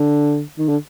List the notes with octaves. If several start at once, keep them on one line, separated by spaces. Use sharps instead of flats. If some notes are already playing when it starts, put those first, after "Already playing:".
Already playing: D3
D#3
D3